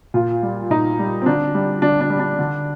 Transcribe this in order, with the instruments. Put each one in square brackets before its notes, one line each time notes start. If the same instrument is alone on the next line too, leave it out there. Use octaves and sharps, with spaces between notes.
[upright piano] A#2 F4
G3
A#2 D#4
G3
C4
D3 D4
G3
D3 D4
D4
G3
D4
D3